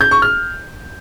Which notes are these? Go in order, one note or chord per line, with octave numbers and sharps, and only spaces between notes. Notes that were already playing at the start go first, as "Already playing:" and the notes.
G6
C#6
F6